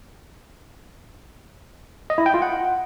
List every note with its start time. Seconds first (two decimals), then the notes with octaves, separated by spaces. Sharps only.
2.10 D#5
2.18 E4
2.26 G5
2.34 F4
2.42 F#5